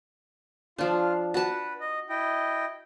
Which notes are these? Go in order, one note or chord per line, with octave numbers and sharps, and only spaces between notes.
F3 D4 F4
F#4 B4 A5
D#5
E4 D#5 G5